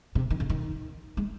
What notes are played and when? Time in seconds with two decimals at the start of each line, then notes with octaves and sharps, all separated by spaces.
0.15 C3
0.30 D#3
0.40 C#3
0.50 D#3
1.17 G#3